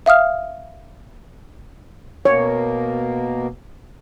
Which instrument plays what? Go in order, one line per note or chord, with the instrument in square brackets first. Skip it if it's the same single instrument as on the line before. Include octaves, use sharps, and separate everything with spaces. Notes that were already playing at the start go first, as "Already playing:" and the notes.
[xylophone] E5 F5 D#6 F6
[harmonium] B2 A#3 [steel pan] C#5